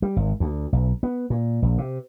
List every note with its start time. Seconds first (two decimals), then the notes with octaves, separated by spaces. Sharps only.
0.02 G3
0.16 G#1
0.40 D2
0.73 B1
1.03 B3
1.30 A#2
1.62 A#1
1.78 C3